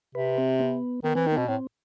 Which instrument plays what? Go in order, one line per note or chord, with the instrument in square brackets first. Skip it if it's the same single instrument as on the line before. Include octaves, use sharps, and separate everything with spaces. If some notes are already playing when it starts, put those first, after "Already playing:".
[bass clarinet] C3 [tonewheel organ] B4
[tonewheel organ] C4
B3
[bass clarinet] D#3 [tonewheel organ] B3
[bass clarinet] E3 [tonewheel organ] C4
[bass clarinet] D#3 [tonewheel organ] D#4
[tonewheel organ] B3
[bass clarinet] B2 [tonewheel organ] C4
[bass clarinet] A2 [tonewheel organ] C4